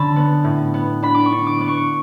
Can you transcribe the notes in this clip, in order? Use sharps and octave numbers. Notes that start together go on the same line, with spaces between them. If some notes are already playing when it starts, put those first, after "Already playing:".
Already playing: D3 C#4 A5 B5
B3
A2
B3
D4 B5
D6
C#6
D4
D6
B3
C#6